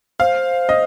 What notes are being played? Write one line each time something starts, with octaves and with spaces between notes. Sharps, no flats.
C5 F5
D#5